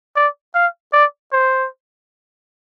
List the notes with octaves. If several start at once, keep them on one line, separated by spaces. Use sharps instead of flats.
D5
F5
D5
C5